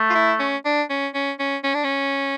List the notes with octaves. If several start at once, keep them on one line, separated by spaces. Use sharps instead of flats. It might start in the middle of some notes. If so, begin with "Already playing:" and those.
Already playing: A3
F4
E4
C#4
D4
C#4
C#4
C#4
C#4
D4
C#4